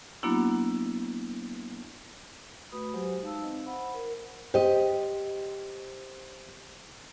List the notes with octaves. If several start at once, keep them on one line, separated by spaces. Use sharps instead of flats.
F#3 A#3 B3 D4 E4 F#4
A3 F#4 B4 B5 D#6
F#3 G#3 F#4 G4 C5
D#4 F5 A5 E6
C4 D#4 D#5
C5 F#5 B5
A#4
G4 C5 D#5